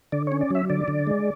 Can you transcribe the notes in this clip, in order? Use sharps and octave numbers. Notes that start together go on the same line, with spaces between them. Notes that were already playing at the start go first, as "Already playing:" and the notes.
D3 D5
C#4 C#5
D5
F#3 E5
D3 D5
D3
G#3